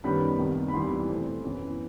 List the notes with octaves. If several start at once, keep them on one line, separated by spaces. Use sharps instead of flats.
F#2 D#3 G3 B3 B5
C2 C3 D#3
B5
E2 C3 E3 G3 C6
B2 A3 C4
F#2 E3 B3